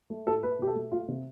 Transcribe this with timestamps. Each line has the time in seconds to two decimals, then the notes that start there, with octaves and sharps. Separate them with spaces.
0.10 A3
0.26 A2 A4
0.43 A3 B4
0.59 B2 G4
0.67 A4
0.75 A3
0.92 A3 F4
1.08 C3